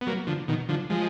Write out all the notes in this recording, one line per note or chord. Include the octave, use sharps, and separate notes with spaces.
B3
F#3 A#3
D3 F3
B2 D#3
D3 F3
F3 G#3